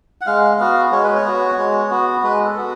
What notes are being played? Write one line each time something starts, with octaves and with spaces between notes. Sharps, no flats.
F#5
G#3 F5
B3 F#4 F5
G#3 C#5
B4
C#5
B3 F#4
G#3
B3 F#4
G#3 B4
A4
B3 F#4